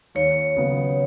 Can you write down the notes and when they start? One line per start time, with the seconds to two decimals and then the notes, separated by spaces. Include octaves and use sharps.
0.15 D#2 C#5
0.57 C#3 F#3 B3